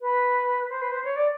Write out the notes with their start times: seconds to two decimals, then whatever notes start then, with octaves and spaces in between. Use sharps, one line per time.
0.01 B4
0.70 C5
0.82 B4
0.91 C5
1.04 C#5
1.16 D5